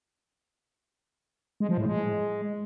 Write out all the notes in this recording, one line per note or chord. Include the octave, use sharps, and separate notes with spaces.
G#3
F3
A2
G#3